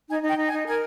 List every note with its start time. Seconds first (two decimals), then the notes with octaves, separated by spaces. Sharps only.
0.09 D#4 G#5
0.23 D#4 G5
0.37 D#4
0.48 G#5
0.52 D#4
0.66 A#4 G#5